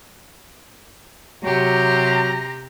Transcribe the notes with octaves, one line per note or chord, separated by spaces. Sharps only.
C3 F#3 G4 A#5